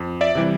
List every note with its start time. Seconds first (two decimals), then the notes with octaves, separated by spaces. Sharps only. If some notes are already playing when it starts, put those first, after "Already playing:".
Already playing: F2
0.21 D5 E5
0.35 C3 E3 G3